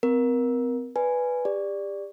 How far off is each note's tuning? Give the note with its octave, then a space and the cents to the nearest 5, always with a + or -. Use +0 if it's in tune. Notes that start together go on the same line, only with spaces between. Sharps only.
C4 -35 A#4 +20
B4 +0 D5 +0 G#5 +0
G4 +35 D5 +0